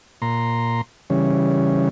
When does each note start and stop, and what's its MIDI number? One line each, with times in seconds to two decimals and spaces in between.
0.22 0.81 46
0.22 0.81 82
0.22 0.81 84
1.10 1.89 49
1.10 1.89 52
1.10 1.89 55
1.10 1.89 61